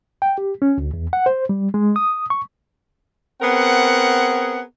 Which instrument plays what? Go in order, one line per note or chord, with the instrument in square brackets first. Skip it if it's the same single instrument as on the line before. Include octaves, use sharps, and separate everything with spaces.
[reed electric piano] G5
G4
C#4
D2
E2
F#5
C5
G3
G#3
D#6
C#6
[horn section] B3 C4 G#4 A#4 F#5